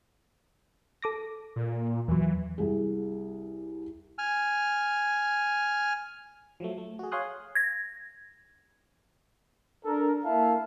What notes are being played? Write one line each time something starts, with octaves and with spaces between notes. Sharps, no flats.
A4 D6 A#6
A#2
E2 E3 F#3
C2 G#4
G#5 F6
F3 F#3 A3
A3
F#4 G#4
C#5 F5 G#5 C6 D#6 F#6
G#6 A#6
D4 A4 A#4
A#3 E4 E5 F5 A5